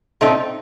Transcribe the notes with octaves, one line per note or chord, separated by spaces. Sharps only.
A#2 A3 C4 D#4